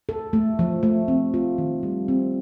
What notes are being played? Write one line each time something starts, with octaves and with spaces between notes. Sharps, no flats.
A4
A3
F3
A3
C4
F4
D#3
G3
C4